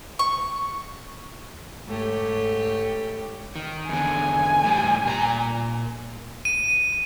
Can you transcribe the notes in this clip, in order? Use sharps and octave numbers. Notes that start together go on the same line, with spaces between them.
C#6
G#2 A3 G4 C#5
D#3
E2 D3 G#5
A2 G3
A#2 A#4 A#5
D#7